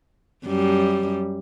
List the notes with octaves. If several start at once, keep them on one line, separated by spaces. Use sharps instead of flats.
F#2 G3